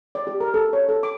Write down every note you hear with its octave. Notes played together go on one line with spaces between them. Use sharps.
D5
G4
A#4
A4
C#5
A4
D6